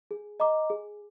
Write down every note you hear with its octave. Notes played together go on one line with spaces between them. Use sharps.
G#4
D#5 A#5 D6
G#4